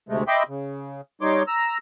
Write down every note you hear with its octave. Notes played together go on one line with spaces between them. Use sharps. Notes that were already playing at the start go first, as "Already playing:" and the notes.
D2 C3 G#3 A3
D#5 E5 G5 B5 C6 D6
C#3
G3 D#4 C#5 C6 D6
A#5 E6